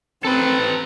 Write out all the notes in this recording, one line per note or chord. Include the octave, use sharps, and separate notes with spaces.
C4 A4 B4